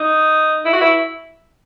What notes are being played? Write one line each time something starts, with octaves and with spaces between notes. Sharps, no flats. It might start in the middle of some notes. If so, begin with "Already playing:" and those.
Already playing: D#4
E4
F#4
E4